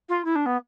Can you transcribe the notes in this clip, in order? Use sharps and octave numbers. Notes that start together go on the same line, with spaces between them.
F4
E4
D4
B3